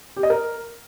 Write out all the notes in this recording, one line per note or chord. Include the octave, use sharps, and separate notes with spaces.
G4
D#5
A#4